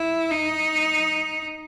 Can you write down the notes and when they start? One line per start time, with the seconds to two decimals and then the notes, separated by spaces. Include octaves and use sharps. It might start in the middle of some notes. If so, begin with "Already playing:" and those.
Already playing: E4
0.31 D#4